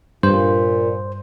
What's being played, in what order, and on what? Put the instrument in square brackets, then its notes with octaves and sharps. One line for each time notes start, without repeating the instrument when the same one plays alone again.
[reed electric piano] G2 [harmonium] A#2 [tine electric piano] C5